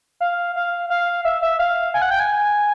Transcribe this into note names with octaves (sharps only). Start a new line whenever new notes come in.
F5
F5
F5
E5
E5
F5
G#5
F#5
G5
G#5